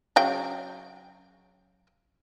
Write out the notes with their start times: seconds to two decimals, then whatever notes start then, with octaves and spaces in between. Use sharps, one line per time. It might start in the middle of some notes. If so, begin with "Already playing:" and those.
0.16 C#3 F#3 G5